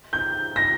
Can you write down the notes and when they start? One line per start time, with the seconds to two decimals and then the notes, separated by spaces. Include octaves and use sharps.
0.13 G6
0.56 A#6